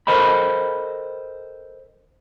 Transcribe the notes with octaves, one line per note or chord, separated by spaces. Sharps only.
A4 A#4 C5 D#5 G5 B5